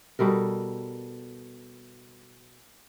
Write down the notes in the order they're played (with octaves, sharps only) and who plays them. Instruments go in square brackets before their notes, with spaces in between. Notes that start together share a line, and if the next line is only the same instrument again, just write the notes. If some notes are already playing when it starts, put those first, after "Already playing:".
[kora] B2 G3 A4 A#4